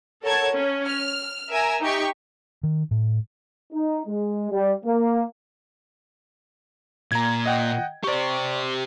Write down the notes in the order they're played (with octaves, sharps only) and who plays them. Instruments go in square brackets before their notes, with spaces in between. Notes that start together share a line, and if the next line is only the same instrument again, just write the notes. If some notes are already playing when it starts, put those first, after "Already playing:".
[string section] A4 A#4 C#5 F#5 A5 G#6
C#4
F6
A#4 E5 G#5 A#5
D#4 G4 C#6
[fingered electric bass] D#3
A2
[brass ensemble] D#4
G#3
G3
A#3
[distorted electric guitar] A#2 [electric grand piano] A#5 G#6
[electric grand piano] D#5 F#5 G5
[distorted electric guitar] G4 C5 [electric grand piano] D5 C#6